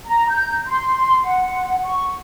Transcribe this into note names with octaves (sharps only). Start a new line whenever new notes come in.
A#5
G6
C6
F#5
C#6